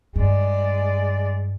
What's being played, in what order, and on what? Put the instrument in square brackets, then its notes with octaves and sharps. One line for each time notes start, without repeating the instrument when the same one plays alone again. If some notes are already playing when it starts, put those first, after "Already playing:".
[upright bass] G2 [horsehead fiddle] G#3 D5